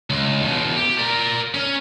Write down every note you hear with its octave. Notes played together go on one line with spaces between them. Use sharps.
C#2
E2 B2
G4
A#4 D5
C#4